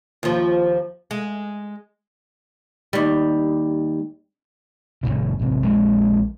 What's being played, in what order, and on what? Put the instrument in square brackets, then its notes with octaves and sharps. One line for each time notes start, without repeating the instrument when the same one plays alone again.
[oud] D#2 F3
G#3
D#2 G3
[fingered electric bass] F#1 B1 A#2 C#3
A1 C3
A#1 G#3